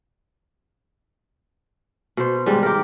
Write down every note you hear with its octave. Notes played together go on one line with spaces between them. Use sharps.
B2 C5
G#2 D#3 G3
G4 A#4